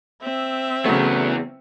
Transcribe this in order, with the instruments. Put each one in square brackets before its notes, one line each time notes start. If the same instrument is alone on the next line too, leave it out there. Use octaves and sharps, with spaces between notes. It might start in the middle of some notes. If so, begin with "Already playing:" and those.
[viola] C4 E5
[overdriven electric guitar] E2 B3 [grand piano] C#3 F#3 A3